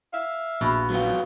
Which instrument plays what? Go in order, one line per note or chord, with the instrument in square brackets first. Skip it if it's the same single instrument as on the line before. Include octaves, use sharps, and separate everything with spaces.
[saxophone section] E5 F5
[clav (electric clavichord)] A#1 [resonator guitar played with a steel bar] B2
[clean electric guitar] F#3 B3 F4